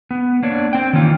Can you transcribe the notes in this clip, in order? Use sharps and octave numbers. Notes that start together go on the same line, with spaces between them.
B3
A#3 D4 C#5
C4 G5
D#3 E3 A#3 C#4 F4